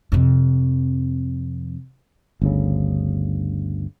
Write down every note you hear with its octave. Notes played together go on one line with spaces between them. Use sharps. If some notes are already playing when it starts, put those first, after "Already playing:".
F2 C3
G1 D2 C#3